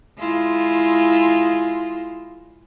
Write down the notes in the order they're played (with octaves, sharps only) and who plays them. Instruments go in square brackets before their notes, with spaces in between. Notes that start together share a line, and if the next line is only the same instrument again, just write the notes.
[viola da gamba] G#3 E4 F4